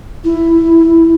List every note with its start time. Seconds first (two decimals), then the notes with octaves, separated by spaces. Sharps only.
0.23 E4